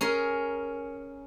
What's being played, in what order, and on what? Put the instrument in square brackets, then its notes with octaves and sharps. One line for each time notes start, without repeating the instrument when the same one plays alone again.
[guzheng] C#4 G#4 A#4